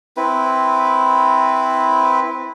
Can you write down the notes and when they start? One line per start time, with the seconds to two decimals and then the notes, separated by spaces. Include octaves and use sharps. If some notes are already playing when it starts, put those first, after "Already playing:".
0.17 C4 E4 B4